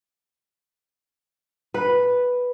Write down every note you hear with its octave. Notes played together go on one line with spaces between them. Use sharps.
B4